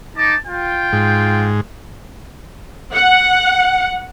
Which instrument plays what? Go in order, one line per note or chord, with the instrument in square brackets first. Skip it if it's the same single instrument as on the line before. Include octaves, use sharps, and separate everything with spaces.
[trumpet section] D#4 A5 D6
F4 G5
[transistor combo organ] G#2
[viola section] F#5